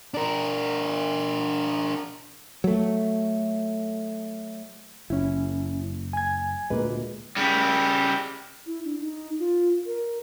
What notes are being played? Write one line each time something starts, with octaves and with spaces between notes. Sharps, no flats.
D4 A#4
F#3 A3
F#1 C#4 E4
G#5 G#6
D2 A#2 G#3 A#3 B4
C#3 G3
E4
D4
D#4
F4
A#4